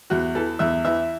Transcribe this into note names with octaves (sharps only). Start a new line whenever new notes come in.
E2 F#4
E3 A4
E2 E5
E3 E5